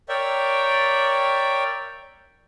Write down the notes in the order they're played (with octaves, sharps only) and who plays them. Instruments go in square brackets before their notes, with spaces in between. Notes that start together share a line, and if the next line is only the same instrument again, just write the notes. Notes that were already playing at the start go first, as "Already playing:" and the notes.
[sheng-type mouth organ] A#4 C#5 D5 E5 G5